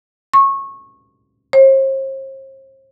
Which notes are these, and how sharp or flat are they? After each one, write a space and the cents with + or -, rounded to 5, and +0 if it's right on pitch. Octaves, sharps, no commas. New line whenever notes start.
C#6 -20
C5 +40